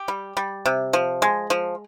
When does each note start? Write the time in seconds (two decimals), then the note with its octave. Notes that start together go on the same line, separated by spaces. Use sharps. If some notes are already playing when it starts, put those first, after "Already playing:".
Already playing: G4
0.08 G3
0.37 G3
0.66 C3
0.93 F3
1.22 G#3
1.50 F3